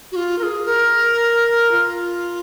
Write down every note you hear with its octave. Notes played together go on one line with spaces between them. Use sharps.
F#4
F4
A#4
G#4
A#4
F4